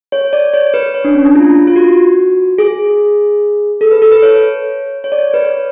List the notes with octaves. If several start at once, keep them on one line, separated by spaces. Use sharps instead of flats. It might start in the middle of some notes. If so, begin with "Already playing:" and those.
C#5
D5
C#5
B4
C#5
D4
C#4
D4
F4
F4
F#4
G#4
A4
B4
A4
B4
C#5
C#5
D5
C#5
B4
C#5